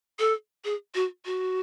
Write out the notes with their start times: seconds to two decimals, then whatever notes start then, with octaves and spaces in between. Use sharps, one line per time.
0.19 A4
0.65 G#4
0.95 F#4
1.25 F#4